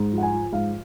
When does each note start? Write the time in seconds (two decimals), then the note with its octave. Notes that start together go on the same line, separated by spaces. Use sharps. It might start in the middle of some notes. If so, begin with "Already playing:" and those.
Already playing: G#2
0.12 F3
0.18 F#5
0.22 G#5
0.32 F3
0.53 G#2 F5